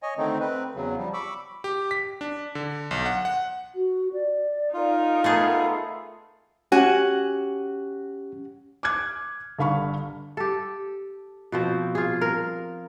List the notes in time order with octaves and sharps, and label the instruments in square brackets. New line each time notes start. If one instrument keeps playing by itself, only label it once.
[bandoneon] C#5 D#5 G#5
D3 D#3 A3 C4 D#4
C4 B4
E2 C#3 F#3
F3 G3
B5 C#6 D6 E6
[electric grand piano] G4
B6
D4
D3
B1
F#5
F#5
[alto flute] F#4
D5
[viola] D#4 A#4 [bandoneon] F4
[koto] A3 B3 G#4 [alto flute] F#5
[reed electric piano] C#4 G4 [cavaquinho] F#4 F#5 G#5
[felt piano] D6 F6 F#6 G#6
G1 D3 F5 B5 C#6
[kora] G4 A4
B2 F3 C4
F4 G#4
A#4